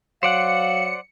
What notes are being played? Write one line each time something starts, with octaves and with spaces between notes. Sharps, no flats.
F#3 C5 D5 F5 F#5 C#7